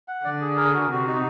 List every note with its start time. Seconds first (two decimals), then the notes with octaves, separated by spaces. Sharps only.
0.08 F#5
0.24 D3 D5
0.41 G#4
0.57 A#4
0.74 F#4
0.90 C3 F#4
1.07 D#4